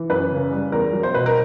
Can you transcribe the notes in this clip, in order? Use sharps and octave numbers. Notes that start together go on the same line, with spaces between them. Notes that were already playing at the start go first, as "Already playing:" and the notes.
Already playing: E3
F#2 B4
C#3
G3
E2 A#4
F#3
C5
B2 B4
A#4